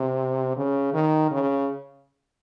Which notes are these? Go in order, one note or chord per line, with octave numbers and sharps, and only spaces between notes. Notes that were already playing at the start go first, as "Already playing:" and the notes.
Already playing: C3
C#3
D#3
C#3